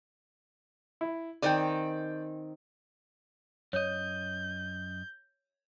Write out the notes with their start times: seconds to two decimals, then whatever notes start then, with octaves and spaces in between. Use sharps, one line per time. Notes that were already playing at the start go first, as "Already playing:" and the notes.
1.01 E4
1.42 D#3 C4 D5 G5 G#5
3.73 F#2 C#5 D#5 G6